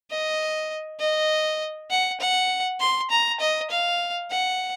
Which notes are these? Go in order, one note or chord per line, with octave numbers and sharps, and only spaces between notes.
D#5
D#5
F#5
F#5
C6
A#5
D#5
F5
F#5